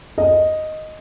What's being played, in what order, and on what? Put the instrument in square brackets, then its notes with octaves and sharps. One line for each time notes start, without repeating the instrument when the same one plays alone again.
[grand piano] D#5